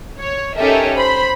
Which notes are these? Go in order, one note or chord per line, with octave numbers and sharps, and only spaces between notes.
C#5
C#4 D#4 G4 A4 A#4 E5
C5 B5